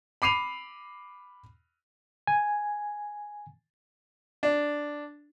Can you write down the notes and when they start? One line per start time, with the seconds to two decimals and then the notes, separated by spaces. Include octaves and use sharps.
0.22 B5 D6 C7 D#7 F7
2.27 G#5
4.43 D4